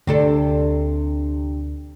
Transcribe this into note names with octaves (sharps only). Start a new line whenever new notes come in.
D2 C3 D4 A4